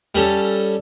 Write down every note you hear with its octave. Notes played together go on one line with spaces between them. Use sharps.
G3 C#4 A4